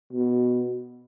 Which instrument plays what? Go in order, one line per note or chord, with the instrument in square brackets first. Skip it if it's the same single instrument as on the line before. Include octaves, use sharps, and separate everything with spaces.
[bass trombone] B2